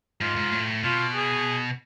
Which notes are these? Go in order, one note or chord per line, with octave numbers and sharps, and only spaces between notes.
G#2 F4
G#2
A2
B2 F4
G#4